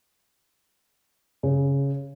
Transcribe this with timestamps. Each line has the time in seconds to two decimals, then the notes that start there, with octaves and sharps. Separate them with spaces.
1.43 C#3